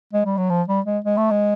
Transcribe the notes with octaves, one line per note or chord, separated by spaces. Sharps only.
G#3
G3
F#3
F3
G3
G#3
G#3
A3
G#3